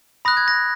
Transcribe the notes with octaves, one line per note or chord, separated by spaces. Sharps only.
B5 D#6 F#6 A#6
G#6
A#6